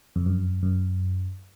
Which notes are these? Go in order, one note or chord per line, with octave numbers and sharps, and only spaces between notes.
F2
F#2
F#2